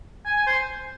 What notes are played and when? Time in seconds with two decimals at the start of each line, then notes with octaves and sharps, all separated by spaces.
0.25 G#5
0.35 G#5
0.47 C5